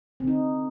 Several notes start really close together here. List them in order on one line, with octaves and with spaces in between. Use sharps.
C4 D3 D#4